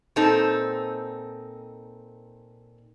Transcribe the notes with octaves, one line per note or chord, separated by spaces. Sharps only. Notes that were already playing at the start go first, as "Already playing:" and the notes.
A#2 C4 D#4 A4